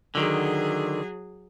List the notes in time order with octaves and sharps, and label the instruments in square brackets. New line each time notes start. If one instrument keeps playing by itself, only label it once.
[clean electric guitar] D3 D#3 [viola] F#3 G#4